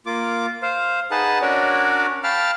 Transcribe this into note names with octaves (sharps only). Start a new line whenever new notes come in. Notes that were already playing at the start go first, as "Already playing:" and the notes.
A#3 F4 D6
C5 F5
D#4 G#4 B4 F#5 A5
C#4 D4 F#4 A#4 C#5 D5
F5 G5 A5 B5 F6